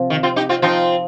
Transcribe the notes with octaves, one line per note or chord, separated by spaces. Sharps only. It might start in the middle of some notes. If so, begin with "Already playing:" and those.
Already playing: C3 F3
D#3
C4 F4
D#4 G4
C4 F4
F3 C4 D#4 F4